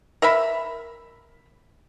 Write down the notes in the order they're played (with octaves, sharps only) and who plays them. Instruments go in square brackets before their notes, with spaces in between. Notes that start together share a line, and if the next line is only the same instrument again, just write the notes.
[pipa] A#4 E5 B5